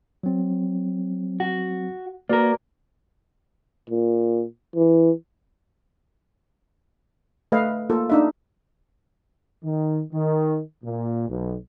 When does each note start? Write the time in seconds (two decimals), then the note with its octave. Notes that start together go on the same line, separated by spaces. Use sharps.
0.23 F#3 C4
1.40 F#4
2.29 A#3 F#4 A#4 B4 D5
3.90 A#2
4.76 E3
7.52 A3 B4 D#5 F5
7.90 A#3 F4 A4
8.10 D4 D#4 E5
9.64 D#3
10.13 D#3
10.84 A#2
11.29 B1